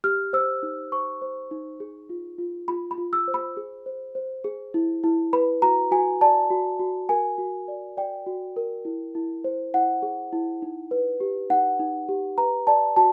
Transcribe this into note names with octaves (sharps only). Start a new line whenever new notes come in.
G4 F6
C5 E6
D#4
C5 C#6
C5
D#4
G#4
F4
F4
F4 B5
B5
F4
E6
C5
B5
G#4
C5
C5
G#4
E4
E4
B4 B5
F#4 A#5
F#4 G#5
D5 A5
F#4
F#4
A#4 G#5
F#4
D5
D5 G5
F#4
A#4
E4
E4
C5
E4 F#5
G#4
E4
D#4
B4
G4
D#4 F#5
D#4
G4
B4 A#5
D5 A5
F#4 A5